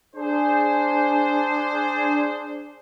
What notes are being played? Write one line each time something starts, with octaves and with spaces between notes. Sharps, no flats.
D4 G#4 C5